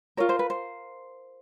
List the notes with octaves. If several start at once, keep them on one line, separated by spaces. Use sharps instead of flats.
F4 A#4 C#5
C5
B4
C5